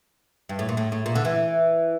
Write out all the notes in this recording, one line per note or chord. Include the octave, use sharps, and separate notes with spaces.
G2
A2
A#2
A2
A2
A#2
D3
E3